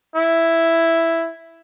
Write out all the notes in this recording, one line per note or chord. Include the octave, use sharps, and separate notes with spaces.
E4